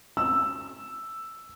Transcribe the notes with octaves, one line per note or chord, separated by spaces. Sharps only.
E6